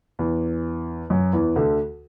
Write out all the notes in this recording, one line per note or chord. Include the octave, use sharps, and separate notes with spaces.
E2 E3
F#2 F#3
E2 E3
D2 D3